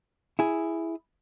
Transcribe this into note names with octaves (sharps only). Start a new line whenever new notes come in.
E4 G#4